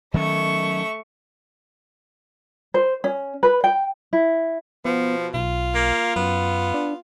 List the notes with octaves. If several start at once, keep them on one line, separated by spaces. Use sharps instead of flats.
D#3 F#3 A3 C#4 C#6
C5
C#4
B4
G5
E4
B2 F3 B3
B1 F4
A#3
F#2 B3
D4